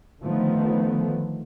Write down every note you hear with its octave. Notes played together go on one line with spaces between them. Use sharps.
D3 D#3 F3 A3 B3